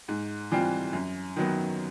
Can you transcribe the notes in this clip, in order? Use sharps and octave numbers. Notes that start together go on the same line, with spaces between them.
G#2
E3 G3 C4 F4
F#2
D#3 F#3 B3